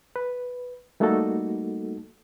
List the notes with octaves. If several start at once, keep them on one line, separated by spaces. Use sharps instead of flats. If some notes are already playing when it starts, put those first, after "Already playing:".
B4
G3 A3 A#3 D#4 F#4 A4